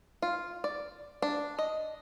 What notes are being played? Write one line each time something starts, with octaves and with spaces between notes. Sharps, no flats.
F4
D5
D4
D#5